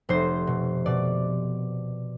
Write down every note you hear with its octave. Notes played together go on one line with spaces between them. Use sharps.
F1 C5
B2
B2 D5